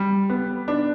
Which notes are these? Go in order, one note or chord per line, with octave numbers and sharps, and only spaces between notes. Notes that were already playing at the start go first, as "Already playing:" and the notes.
Already playing: G3
B3
D4